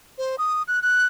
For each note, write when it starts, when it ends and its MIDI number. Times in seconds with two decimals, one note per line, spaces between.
0.18 0.36 72
0.38 0.62 87
0.68 0.82 90
0.82 1.05 90